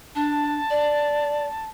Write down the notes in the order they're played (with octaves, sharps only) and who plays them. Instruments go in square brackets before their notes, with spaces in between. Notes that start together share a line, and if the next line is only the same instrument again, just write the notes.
[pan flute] D4 [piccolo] A5
[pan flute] D5